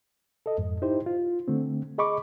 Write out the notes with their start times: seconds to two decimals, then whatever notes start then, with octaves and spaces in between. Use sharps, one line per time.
0.46 A4 D#5
0.58 F2 G#2
0.82 D#4 E4 G4 C5
1.06 F4
1.48 D3 A3 C4
1.98 G#4 D#5 B5 C#6 D6